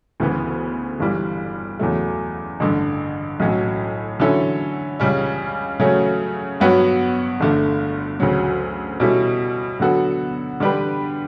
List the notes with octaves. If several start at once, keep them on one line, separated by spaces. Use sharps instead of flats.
D2 C#3 E3 B3
G1 G2 E3 G3
E2 C#3 F#3 A3
A1 G2 D3
B1 A2 F#3 C#4
D3 F#3 C#4 E4 A4
C#2 C#3 G3 C#4
C#3 F#3 A3 C#4
G2 F#3 B3 F#4 C#5
G1 G2 D3 A3
D2 C#3 F#3
B2 G3 C#4 E4 A4
D3 F#3 B3 F#4 A4
D3 G3 D4 G4 B4